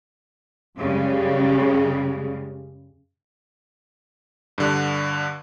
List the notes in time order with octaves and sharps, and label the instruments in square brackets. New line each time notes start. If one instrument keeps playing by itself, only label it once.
[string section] F#2 C#3 G3 G#3
[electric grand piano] G2 D3 F#6